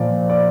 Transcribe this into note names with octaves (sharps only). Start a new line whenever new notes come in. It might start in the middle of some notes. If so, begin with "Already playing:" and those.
Already playing: A#2 F3 D5
D5